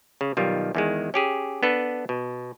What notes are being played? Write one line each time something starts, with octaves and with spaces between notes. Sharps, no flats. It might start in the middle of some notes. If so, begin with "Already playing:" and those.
C#3
B1 D#3 G3 F4
E2 D#3 G#3
C#4 G4 G#4
B3 D4 A4 B4
B2